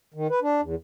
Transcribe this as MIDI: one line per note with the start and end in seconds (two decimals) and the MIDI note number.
0.14 0.27 51
0.30 0.40 71
0.42 0.61 62
0.61 0.75 40